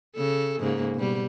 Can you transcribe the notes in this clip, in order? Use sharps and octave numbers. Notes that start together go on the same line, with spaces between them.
C#3 A4
G#2 C#3 A#3
B2 G3